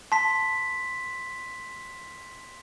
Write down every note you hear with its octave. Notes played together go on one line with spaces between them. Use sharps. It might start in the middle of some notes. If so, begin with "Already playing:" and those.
A5 C6 B6